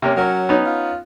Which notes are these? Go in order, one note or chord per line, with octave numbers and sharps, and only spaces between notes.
C3 A#3 C#4
F#3 C#4 A#4
B3 C#4 D#4
F4